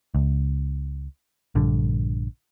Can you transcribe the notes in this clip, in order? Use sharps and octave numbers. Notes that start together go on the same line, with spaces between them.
C#2
A#1 G2 D3